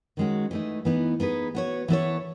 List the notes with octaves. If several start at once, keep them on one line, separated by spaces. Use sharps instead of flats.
D#3 G#3 C#4 F#4
E3 A3 D#4
E3 B3 D#4
B3 D#4 G#4 B4
B3 F#4 C#5
E3 B3 E4 A4 C#5